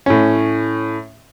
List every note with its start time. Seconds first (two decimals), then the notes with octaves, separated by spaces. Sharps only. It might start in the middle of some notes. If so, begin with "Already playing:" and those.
0.06 A2 C#4